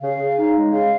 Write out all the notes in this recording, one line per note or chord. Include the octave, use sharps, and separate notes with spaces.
C#3 F5
C#3
D#4
G#3
C#3 F5